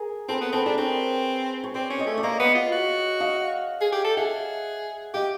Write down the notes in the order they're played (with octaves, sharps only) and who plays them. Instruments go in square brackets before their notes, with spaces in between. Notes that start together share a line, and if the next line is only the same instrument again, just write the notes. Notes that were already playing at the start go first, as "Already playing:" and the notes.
Already playing: [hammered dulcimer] G#4 A#4
[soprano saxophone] C4 [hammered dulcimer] A4 B4
[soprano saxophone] B3
[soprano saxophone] C4 [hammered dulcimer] A4 B4
[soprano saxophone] D4 [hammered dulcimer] G#4 A#4
[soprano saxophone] C4 [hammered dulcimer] B4 C#5
[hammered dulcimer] C#5
[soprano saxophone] C4 [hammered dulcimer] C5 D5
[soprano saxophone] C#4
[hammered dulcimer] C#5 D#5
[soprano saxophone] A3
[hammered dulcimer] D5
[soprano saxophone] A#3 [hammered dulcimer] C#5 D#5
[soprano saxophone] B3
F4
F#4
[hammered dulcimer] D#5 F5
[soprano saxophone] G#4
G4
A4
[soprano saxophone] G#4 [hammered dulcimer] E5 F#5
[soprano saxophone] G4 [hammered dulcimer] D#5 F5